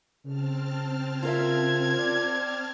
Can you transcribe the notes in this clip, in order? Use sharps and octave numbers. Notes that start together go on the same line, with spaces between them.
C#3 C4 A5 F6
F4 A#4 E5 G#6
D5